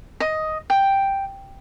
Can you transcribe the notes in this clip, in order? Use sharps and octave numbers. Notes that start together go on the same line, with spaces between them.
D#5
G5